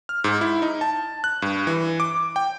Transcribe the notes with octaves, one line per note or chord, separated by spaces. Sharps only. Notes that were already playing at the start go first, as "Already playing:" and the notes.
F6
G#2
E4
D#4
A5
F#6
G2
E3
D6
G5